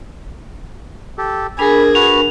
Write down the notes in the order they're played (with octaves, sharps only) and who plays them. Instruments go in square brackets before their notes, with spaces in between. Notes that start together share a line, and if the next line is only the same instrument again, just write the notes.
[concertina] G4 A4
[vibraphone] D4 A#4 [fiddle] G#4 [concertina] B5
[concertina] F#4 B4 [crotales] F7